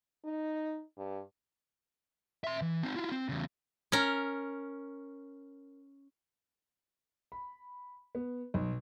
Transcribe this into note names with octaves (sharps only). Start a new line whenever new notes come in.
D#4
G2
E5 C6
E3
C4 D#4
E4 F4
C4
E2 C#3
C#4 A#4
B5
B3
B1